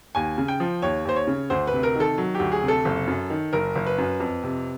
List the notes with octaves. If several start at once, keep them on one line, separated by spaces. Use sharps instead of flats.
D#2 G#5
C#3
G5
F3
D#2 C#5
D#2 C5
C#5
C#3
D2 C5
C3 B4
A#4
D#3 A4
F#3
D2 G4
G#4
C3
A4
F#1
F#2
D#3
F#1 A#4
F#1
B4
F#2
F2
C3